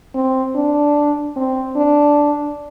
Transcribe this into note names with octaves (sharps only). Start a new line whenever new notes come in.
C4
D4
C4
D4